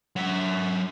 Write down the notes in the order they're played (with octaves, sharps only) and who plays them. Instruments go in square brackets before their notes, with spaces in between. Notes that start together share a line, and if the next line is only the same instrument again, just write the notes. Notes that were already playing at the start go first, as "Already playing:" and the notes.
[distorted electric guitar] F#3 E5